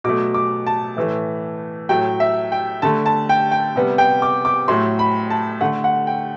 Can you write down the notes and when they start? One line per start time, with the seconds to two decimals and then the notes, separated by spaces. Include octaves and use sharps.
0.04 B2 F#3 A3 D6
0.34 D6
0.67 A5
0.97 A2 E3 A3
1.89 A2 F#3 A3 G5
2.20 E5
2.52 G5
2.82 D3 A3 A5
3.06 A5
3.29 G5
3.51 G5
3.76 C3 G3 B3
3.98 G5
4.22 D6
4.45 D6
4.68 A2 F#3 A3 C6
4.99 B5
5.30 A5
5.61 D3 A3 F#5
5.84 F#5
6.07 G5